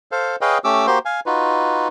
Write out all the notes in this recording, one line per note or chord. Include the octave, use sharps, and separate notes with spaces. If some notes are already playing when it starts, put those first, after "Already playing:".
A4 C5 F5
G#4 B4 C#5 D#5 F5 G5
A3 C#4 G4 D6 E6
A#3 F#4 G4 C5 C6
F5 G#5
D#4 F4 F#4 B4